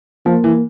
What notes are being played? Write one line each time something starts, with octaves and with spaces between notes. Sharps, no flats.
F3 A#3
E3